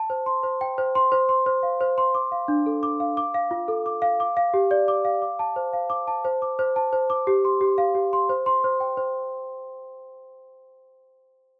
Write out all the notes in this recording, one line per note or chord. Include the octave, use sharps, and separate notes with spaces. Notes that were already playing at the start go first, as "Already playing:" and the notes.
Already playing: A5
C5
C6
C5
G5
C5
C6
C5
C6
C5
F5
C5
C6
D6
F5
D4
A4
D6
F5
D6
F5
F4
A4
D6
F5
D6
F5
G4
D5
D6
F5
D6
A5
C5
F5
D6
A5
C5
D6
C5
A5
C5
D6
G4
C6
G4
F5
G4
C6
C5
C6
C5
G5
C5